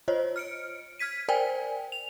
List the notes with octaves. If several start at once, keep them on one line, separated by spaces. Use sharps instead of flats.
F4 C5 C#5 D#5
F6 C#7 D7
F6 G#6 B6 D#7
A#4 C5 D5 G5 G#5
F7